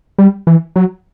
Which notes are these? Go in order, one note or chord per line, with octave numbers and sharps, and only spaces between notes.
G3
E3
F#3